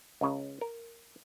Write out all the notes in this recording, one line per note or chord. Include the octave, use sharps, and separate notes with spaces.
C#2 C#3
A#4